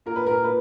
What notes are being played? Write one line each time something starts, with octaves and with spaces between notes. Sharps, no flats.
A#2 A#4
B4
A#4
A#2 B4